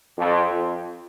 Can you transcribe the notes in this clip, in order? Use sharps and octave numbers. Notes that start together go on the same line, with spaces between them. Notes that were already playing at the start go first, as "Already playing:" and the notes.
F2
F2